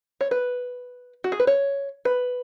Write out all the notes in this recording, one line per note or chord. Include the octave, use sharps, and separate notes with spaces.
C#5
B4
F#4
G#4
B4
C#5
B4